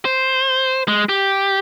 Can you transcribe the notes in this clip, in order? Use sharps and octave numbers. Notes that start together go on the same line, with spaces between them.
C5
G#3
G4